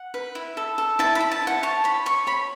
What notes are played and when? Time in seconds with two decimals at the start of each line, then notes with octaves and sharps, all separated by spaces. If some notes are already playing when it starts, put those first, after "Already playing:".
Already playing: F#5
0.14 B4
0.35 E4
0.57 A4
0.78 A4
0.99 E4 A5
1.15 B5
1.20 E4
1.32 A5
1.42 E4
1.47 F#5
1.63 C#5 A5
1.84 C#5 B5
2.06 C#5 C#6
2.27 C#5 B5